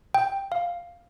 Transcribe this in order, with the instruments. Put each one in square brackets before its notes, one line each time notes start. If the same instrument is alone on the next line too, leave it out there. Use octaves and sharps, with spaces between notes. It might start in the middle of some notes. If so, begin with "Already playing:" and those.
[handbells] G5
F5